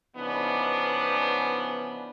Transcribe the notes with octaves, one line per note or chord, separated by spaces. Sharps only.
C#3 E3 F3 B3 D4 D#4